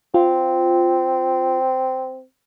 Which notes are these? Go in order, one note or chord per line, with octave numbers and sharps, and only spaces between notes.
C4 F4